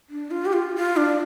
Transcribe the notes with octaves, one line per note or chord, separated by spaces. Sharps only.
D4
F4
G4
F4
F4
D4